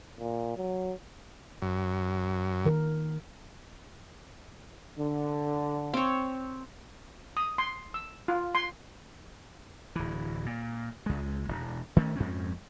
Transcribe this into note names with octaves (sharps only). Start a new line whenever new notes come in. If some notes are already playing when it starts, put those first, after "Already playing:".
A#2
F#3
F#2
D#3 A#4
D3
C4 C#5
D#6
C6
E6
F4
C6
D1 E3
A#2
C#2 G#3
E1
D#3 A3 C#4
F2 G#2 C4 C#4